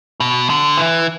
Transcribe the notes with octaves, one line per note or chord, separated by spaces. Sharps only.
B2
D3
E3